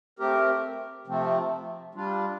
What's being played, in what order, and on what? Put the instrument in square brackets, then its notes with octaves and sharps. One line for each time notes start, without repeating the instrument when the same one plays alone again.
[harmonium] A3 C4 G4 A#4
C3 F3 A3 C4
G3 D4 F4